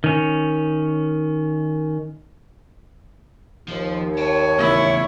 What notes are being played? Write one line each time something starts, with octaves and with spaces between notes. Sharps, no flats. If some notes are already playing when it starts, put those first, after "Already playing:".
D#3 C#4
D#2 F3
C#5 G5 A5
E2 C#3 E4